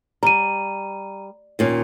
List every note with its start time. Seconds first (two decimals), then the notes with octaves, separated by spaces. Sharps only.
0.23 G3 A#5 D#7
1.59 D#2 A#2 C#4